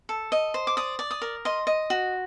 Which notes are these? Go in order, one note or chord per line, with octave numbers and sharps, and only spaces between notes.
A4
D#5
C5
D6
D5 D#6
D5
D#6
A#4
D#5 C6
D#5
F#4